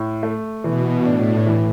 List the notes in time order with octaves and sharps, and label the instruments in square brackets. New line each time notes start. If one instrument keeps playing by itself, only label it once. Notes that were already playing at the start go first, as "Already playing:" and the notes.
Already playing: [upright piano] A2
A3
[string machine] B2 [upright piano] E3
[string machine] A2 [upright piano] D4
[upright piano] E3